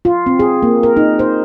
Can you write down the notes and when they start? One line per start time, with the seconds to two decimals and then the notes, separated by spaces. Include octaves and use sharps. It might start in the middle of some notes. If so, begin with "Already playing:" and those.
0.05 F4
0.26 C4
0.39 G#4
0.63 A#3
0.83 A#4
0.97 D#4
1.19 C5